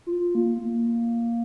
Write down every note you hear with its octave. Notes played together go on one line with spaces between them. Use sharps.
F4
A#3
A#3